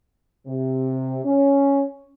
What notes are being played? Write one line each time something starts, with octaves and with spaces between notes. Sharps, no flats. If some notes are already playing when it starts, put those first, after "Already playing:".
C3
C#4